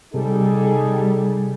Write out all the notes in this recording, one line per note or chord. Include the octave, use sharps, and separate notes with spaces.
C3 G3 D#4 G#4 A4